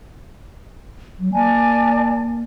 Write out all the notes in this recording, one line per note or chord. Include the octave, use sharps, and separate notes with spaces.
F#3
A#3 D5 G#5 A5